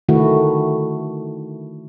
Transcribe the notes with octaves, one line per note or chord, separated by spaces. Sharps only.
D3 D#3 A3 E4 F#4